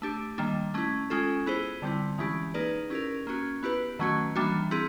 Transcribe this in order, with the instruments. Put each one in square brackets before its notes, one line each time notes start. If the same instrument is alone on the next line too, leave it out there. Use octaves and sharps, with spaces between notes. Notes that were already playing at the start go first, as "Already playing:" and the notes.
[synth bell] A3 D4 G4
D#3 G3 A#3 D4
A3 C#4 E4
G#3 C#4 F4 A4
B3 E4 G#4 C5
D3 G3 C4 E4
E3 G#3 C#4 E4 G4
A#3 D#4 G#4 B4 D5
C#4 E4 G4 A#4
A#3 C#4 F#4
B3 E4 G4 B4
D#3 F#3 A3 C#4 F#4
E3 G3 A#3 D4 F#4
C4 E4 G#4